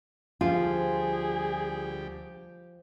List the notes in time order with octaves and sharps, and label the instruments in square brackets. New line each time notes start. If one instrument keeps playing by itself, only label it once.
[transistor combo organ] D2 G3 G4 [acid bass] F3 [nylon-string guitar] F4 [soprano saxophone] G#4